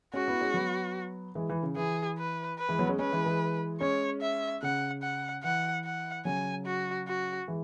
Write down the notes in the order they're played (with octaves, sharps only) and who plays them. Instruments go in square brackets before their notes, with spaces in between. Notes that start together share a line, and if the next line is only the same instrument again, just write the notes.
[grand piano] G#3 C#4 [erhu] F#4
[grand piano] B3 E4
G#3 C#4
F#3 B3
E3 G#3
E3
C#3
[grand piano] E3 [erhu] G#4
[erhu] B4
B4
[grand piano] E3 G#3
F#3 B3
G#3 C#4
[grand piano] G#3 C#4 [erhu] B4
[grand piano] E3 G#3
E3 G#3
[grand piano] G#3 C#4 [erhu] C#5
[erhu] E5
[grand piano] C#3 [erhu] F#5
[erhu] F#5
[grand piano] E3 [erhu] F#5
[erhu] F#5
[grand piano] C#3 F#3 [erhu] G#5
[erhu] F#4
F#4
[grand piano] E3 G#3